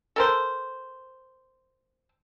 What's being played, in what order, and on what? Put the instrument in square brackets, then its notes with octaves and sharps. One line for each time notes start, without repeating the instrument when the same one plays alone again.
[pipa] A4 A#4 C5